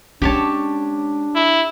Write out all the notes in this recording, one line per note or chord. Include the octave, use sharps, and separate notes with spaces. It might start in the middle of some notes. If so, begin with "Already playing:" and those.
G#3 C#4 D4 G4 C#5 A5
E4